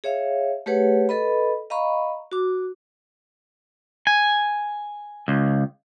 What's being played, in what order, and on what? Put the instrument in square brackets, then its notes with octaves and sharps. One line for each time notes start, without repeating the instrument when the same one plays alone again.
[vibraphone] G#4 C#5 E5 F5
A3 G4 G#4 B4 C#5 F#5
A4 B4 D#5 B5
D#5 F5 A#5 B5 C#6
F#4 D6
[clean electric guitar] G#5
C#2